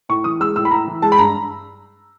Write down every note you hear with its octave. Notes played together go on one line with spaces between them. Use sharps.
A2 C#6
E3 D#6
G#3 E6
A2 E6
B5
A2 A#5
E3
G#3 A5
B5
G2 A#5